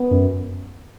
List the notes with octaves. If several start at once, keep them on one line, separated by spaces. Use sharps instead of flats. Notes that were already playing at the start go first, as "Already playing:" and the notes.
Already playing: B3
F#2